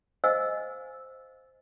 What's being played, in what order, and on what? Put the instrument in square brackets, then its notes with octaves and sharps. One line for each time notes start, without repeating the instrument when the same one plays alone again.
[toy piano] C5 D#5 F5 G#5 E6